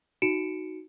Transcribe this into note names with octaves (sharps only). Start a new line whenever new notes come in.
D#4 F#4 C#7 D7 E7